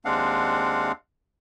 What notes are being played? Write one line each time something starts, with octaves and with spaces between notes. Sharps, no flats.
D#2 G#3 C4 D4 F5 F#5